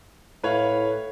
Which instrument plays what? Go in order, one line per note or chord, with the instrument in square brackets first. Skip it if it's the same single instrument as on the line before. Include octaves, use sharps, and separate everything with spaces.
[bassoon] A2 [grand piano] B4 C#5 F5